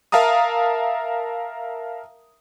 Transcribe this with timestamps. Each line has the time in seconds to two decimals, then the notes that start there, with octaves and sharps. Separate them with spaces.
0.12 A#4 E5 F5 A5 A#5 D#6